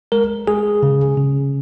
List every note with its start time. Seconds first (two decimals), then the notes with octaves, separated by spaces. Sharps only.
0.12 G#3 A#4
0.47 G#3 G#4
0.83 C#3
1.17 C#3